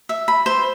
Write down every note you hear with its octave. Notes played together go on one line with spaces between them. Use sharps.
E5
B5
C5